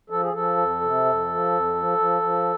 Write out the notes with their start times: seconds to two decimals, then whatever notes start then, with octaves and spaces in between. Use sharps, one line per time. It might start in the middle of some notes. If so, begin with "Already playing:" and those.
0.10 F3 A4
0.21 G#4
0.33 F3 A4
0.57 F2
0.81 C3
1.05 F2
1.28 F3
1.52 F2
1.75 F3
1.98 F3
2.22 F3